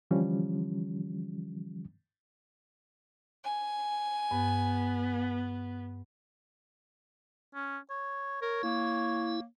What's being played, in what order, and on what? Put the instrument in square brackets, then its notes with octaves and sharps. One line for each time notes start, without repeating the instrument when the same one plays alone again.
[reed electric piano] D3 E3 F3 G3 C#4
[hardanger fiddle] G#5
[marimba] G2 [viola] B3
[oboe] C#4
C#5
[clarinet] A#4 [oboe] C#5
[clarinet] A#3 [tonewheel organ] E4